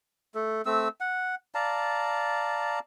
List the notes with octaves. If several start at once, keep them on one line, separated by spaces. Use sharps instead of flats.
A3 A4
A3 C4 E6
F#5
D5 F5 A5 A#5